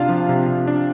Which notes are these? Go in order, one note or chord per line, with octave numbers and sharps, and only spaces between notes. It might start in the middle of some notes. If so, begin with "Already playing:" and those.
Already playing: C3 D4 F4 F5
F3
C3
C3
D4